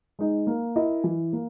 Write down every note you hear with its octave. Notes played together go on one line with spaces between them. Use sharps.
G#3 D#4
A#3
E4 A#4 D#5
E3
A#3